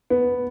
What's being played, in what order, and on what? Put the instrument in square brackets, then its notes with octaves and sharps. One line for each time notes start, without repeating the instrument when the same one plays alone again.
[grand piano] B3